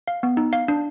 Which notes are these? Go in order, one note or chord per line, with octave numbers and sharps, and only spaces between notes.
F5
B3
D#4
F5
D4